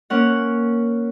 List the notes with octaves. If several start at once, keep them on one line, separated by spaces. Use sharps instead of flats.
A#3 C#4 F#5